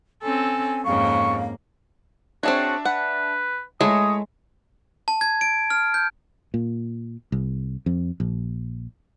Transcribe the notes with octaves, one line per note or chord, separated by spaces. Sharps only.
C4 C#4 A4 G#5
F2 G#2 C#3 A#3 F5 C#6
C4 D4 F#4 G#4 C#5 E5 A5
B4 F#5
G#3 A3 E4 C#5 D#6
A5
G#6
D7
F6
G6
A#2
C2
F2
A#1